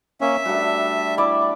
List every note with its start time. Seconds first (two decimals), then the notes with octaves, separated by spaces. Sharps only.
0.21 A#3 C#4 E5
0.45 G3 A3 D4 F#4
1.18 E4 D5